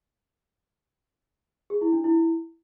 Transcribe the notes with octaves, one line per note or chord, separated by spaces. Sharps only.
G#4
E4
D4
E4